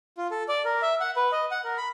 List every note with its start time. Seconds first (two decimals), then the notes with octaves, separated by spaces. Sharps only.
0.17 F4
0.31 A4
0.48 D5
0.65 A#4
0.82 E5
1.00 F#5
1.16 B4
1.32 D#5
1.51 F#5
1.64 A#4
1.78 B5